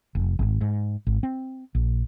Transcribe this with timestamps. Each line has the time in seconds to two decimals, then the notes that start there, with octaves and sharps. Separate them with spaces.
0.15 F1
0.39 G#1
0.61 G#2
1.07 G#1
1.23 C4
1.75 A#1